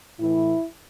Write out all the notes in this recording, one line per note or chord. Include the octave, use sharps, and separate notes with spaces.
A2 E3 E4